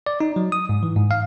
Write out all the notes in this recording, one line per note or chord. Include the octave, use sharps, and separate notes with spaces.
D5
D#4
F#3
D#6
G#2
E3
G#2
F5